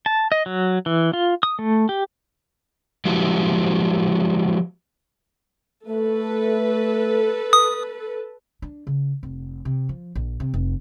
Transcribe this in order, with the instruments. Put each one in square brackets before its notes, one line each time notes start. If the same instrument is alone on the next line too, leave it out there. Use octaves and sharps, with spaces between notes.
[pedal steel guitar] A5
D#5
F#3
E3
F4
D#6
A3
G4
[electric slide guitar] F3 G#3 E4 F#4 G4
[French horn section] A3 [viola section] A4 B4
[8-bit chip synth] D#6
[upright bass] D4
C#3
F1
C3
F3
A#1
C3
F1